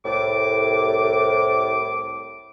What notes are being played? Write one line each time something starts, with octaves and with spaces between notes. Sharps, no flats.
C2 A2 D6